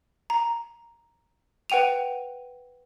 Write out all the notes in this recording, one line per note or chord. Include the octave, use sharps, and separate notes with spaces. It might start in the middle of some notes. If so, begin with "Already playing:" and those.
A#5
B4 F#5 G5 D#7 F7